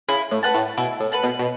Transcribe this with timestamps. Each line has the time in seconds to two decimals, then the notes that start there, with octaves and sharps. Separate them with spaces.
0.09 C#3 E4
0.31 A2
0.43 B4 F#5 A5
0.55 A2
0.77 B2 E4
1.00 A2
1.12 B4 F#5 A5
1.23 B2
1.39 B2